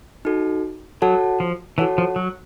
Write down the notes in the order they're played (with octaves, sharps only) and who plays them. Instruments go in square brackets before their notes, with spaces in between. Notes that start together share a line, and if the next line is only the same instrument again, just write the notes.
[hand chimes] D#4 F#4 A4
[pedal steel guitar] F#3 [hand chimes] F#4 A4 C#5 F#5 A5
[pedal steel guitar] F3
[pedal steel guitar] E3 [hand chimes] F#4 A4 C#5 F#5 A5
[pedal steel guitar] F3
F#3